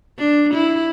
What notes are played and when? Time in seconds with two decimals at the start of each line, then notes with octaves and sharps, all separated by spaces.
0.18 D4
0.54 E4